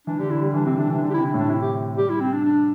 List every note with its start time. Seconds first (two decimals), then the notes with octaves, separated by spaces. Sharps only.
0.07 E3 D4
0.19 D3 G4
0.31 D3 E4
0.42 G3
0.54 E3 D4
0.66 C3 C4
0.78 C3 D4
0.90 E3 D4
1.01 D3 D4
1.10 G4
1.14 C3 E4
1.26 D4
1.34 A2
1.38 D4
1.50 C3 E4
1.62 G4
1.97 G3 G4
2.10 E4
2.21 C4
2.33 D4
2.44 D4